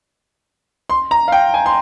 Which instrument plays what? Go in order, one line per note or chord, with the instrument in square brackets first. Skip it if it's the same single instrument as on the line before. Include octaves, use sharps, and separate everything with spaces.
[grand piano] C6
A#5
F5
G5
G#5
C6